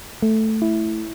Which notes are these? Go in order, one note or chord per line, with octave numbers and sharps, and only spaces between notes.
A3
E4